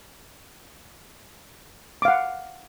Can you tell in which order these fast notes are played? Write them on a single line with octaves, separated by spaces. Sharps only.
D6 F5 F#5